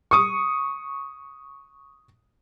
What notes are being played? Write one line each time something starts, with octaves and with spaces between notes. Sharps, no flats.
C#6 D#6